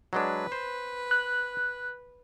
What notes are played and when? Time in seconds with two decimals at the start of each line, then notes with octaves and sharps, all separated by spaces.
0.13 F#3 G#3 D4 B4
0.52 C5
1.11 F#6